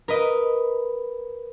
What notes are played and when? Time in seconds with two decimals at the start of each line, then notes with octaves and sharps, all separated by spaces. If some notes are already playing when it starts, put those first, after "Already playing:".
0.08 A#4 B4 D#5